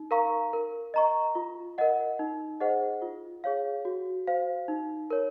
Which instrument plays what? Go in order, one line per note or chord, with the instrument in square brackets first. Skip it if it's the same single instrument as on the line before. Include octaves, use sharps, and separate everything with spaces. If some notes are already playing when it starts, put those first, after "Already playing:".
Already playing: [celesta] D#4
A#4 F5 A#5 C#6
A#4
D#5 A#5 C#6
F4
A#4 D#5 F#5
D#4
G#4 C5 D#5 F#5
F4
G#4 C#5 F5
F#4
C5 F5
D#4
A#4 C#5